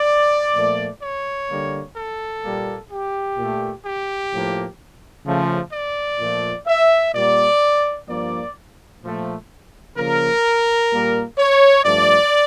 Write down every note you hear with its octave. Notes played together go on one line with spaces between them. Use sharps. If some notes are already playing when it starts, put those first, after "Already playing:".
Already playing: D5
A#2 F3 A3
C#5
D3 G3 A#3
A4
A#2 G3 A#3
G4
A#2 A3
G4
A2 F3 A#3
C#3 F3 A3
D5
A#2 F3 A3
E5
A#2 G3 A#3 D5
G2 F3 A#3 D5
A#2 F3 A3
C#3 F3 A#3 A#4
A#2 G3 A#3
C#5
G2 F3 A3 D5